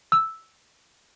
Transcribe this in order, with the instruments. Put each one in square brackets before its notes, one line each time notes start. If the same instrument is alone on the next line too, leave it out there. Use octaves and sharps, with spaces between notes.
[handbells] E6